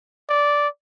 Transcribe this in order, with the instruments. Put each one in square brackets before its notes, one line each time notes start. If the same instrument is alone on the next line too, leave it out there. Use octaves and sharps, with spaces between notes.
[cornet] D5